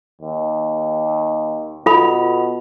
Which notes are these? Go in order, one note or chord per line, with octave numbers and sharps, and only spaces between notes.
D#2
B2 F4 A4 B5